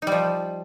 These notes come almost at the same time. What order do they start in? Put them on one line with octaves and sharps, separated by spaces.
D#4 G3 F3